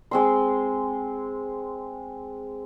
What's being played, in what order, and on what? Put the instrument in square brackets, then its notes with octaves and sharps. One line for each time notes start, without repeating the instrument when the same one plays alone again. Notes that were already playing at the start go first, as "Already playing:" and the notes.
[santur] G#3 C4 C6